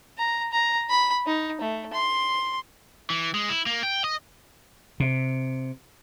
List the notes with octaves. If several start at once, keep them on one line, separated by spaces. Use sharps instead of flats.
A#5
A#5
B5
D#4
A3
C6
E3
G#3
E4
A#3
G5
D#5
C3